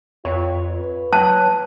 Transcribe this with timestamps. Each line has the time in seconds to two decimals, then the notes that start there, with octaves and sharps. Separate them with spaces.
0.25 F2 F4 C#5
0.71 B4
1.13 F#3 A5 F#6